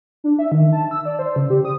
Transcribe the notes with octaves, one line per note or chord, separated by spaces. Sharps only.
D4
E5
D#3
A5
E6
D5
C5
C#3
G4
D#6